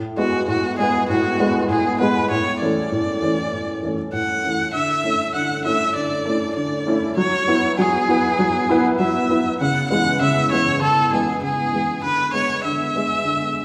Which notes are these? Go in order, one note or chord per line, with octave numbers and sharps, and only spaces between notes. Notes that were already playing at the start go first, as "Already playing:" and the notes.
Already playing: A2
G#3 B3 F#4
A2 F#4
G#3 B3 G#4
A2 F#4
G#3 B3
A2 G#4
G#3 B3 B4
A2 C#5
E3 A3 C#4 D5
A2
E3 A3 C#4
A2
E3 A3 C#4
A2 F#5
E3 A3 C#4
D3 E5
A3 C#4 E4
D3 F#5
A3 C#4 E4 E5
D3 D5
A3 C#4 E4
D3 D5
A3 C#4 E4
F#3 C#5
B3 E4
F#3 G#4
B3 E4
F#3
B3 E4
F#3 E5
B3 E4
C#3 F#5
E3 G#3 B3 F#5
C#3 E5
E3 G#3 B3 C#5
C#3 A4
E3 G#3 B3 G#4
C#3 G#4
E3 G#3 B3
D3 B4
G#3 B3 C#5
D3 E5
G#3 B3
D3